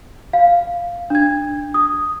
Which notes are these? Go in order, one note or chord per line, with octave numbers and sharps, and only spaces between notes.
F5
D4 G#6
D#6